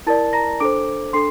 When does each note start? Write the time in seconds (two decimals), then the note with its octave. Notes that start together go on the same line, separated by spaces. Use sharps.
0.07 E4 A#4 D5 A5 A6
0.33 A#5 A#6
0.60 D4 A4 C5 D6 D7
1.13 D4 A4 C6 C7